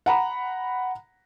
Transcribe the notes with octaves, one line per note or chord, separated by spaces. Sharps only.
F#5 A#5 B5